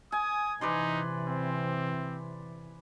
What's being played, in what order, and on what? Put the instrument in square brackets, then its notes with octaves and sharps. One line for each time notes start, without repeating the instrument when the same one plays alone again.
[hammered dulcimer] G#5 [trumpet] D#6
[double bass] C3 E3 [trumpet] D#4 [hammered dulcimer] B4 D5 C6
[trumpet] C4